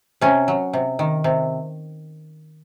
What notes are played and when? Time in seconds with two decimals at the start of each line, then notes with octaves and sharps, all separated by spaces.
0.21 C3 C#4
0.48 F#3
0.73 C3
0.99 D#3
1.24 C3